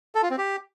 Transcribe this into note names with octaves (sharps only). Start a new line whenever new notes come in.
A4
F4
C4
G4